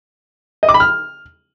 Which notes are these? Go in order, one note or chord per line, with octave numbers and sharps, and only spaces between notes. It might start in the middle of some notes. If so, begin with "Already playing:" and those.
D#5
D6
B5
F6